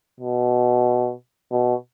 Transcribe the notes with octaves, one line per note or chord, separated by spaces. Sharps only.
B2
B2